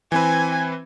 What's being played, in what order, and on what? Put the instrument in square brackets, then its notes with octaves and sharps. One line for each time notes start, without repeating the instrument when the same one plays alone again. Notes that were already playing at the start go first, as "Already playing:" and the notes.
[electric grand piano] E3 C4 B4 [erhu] G#5